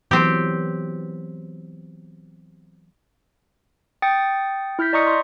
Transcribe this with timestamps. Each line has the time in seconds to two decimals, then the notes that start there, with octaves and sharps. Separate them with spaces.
0.11 E3 F#3 B3 C4 G4
4.02 G5 D#6 A6 C#7
4.79 E4 F6 G6 B6
4.93 D5 D#5 A#5 C#6 D#6 C#7
5.07 C6